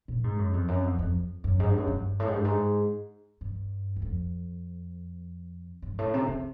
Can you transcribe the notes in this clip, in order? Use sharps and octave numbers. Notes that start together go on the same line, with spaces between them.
A#2
G#2
F#2
F2
F#2
F2
F2
F#2
G#2
G2
F#2
G2
A2
G#2
G2
G#2
G2
F#2
F2
G2
A2
C3
C#3